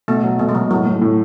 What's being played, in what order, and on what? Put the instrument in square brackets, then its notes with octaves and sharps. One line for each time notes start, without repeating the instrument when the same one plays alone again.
[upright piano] B2 [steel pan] A3
[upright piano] F#3
[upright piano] B2 [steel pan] A3
[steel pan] G#3
[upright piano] B2 [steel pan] F#3
[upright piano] A2 [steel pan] F#3
[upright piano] A2
A2